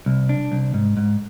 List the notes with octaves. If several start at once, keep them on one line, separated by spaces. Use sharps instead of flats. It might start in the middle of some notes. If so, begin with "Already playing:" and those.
C2
D4
C2
G#2
G#2